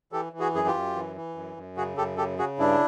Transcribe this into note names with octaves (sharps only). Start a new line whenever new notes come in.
E3 G4 A4
E3
F#4 G#4
F#2 G#4
F4 G4
F#2
E3
E3
F#2
F#2
C#3 F#4 G#4
F#2 G4 A4
C#3 G4 A4
C#3 F#4 G#4
G2 D4 E4